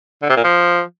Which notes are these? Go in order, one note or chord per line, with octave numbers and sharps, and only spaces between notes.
D3
C3
A#2
F3